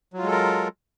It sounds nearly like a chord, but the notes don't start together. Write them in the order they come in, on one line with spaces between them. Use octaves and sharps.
F#3 F4 G#3 A4 A#4